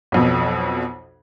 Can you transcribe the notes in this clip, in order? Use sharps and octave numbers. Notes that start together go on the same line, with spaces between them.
B1 F2 B2